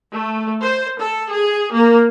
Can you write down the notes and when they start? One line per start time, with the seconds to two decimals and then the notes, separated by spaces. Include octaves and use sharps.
0.13 A3
0.62 C5
0.98 A4
1.31 G#4
1.73 A#3